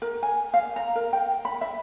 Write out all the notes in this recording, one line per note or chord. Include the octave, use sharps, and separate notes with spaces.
A#4
G#5
F5
A#5
A#4
G5
B5
E5